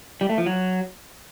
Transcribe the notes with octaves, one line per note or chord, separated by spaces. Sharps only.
G3
A3
F3
F#3